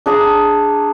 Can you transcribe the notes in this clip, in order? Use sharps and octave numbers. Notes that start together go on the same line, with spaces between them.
D4 G#4 A#5 B5